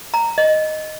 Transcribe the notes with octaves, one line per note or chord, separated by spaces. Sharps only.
A#5
D#5